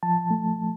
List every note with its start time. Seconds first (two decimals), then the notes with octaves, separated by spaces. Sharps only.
0.03 F3 A5
0.31 A3